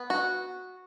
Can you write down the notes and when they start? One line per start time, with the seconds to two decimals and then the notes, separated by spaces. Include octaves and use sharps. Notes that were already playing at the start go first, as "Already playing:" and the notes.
Already playing: B3
0.10 F#4